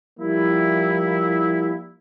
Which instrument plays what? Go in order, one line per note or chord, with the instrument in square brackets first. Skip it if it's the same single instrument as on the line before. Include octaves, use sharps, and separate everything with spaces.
[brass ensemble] F3 G3 A#3 E4